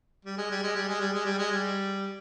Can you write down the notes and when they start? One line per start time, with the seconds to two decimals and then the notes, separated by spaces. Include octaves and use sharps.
0.25 G3
0.37 G#3
0.50 G3
0.63 G#3
0.75 G3
0.88 G#3
1.00 G3
1.13 G#3
1.25 G3
1.38 G#3
1.51 G3